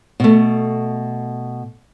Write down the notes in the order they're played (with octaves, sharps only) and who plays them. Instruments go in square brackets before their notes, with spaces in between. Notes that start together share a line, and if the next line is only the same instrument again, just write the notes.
[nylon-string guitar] B2 A3